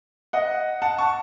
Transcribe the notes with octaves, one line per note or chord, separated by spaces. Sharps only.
D#5 F#5
F#5 A5
A5 C#6